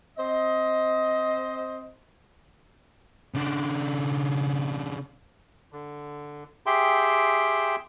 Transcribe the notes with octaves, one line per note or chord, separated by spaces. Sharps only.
C4 C5 D#5
C#3 D4
D3
G4 G#4 E5 G5 C6